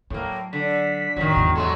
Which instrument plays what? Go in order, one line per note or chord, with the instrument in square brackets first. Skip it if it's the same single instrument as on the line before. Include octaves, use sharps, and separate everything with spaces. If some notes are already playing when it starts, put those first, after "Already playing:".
[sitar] A2 A#3 [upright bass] F#3
[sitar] D3 [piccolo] B6
[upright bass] A1 F#2 [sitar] D#3 F#3
[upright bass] E2 G#2 [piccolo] A#5
[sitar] F#3 G#3 A3 [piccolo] C6